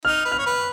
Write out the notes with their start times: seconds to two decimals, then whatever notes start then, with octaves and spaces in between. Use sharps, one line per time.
0.05 D#4 F6
0.25 B4
0.32 F6
0.38 C#5
0.46 B4